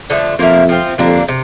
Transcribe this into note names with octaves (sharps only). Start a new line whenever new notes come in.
D3 F3 A3
F2 F3 A#3 E4 A#4
F3 C4 F4
F2 D3 G3 A#3 D4
C3